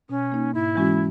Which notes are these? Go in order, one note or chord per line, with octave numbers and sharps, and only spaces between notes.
B2 C#4
A#3 D#4
G#2 E4
E3 G#3 C#4 F#4